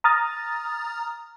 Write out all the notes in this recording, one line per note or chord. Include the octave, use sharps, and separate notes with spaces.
A#5 D#6 F6 A6